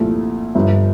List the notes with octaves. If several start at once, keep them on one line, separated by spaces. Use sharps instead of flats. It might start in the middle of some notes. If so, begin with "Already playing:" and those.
Already playing: C2 A#2 F3 A3 E4
G1 G2 F3